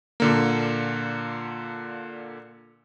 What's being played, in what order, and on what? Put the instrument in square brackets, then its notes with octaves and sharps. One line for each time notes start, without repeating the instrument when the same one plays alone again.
[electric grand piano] A#2 D3 A#3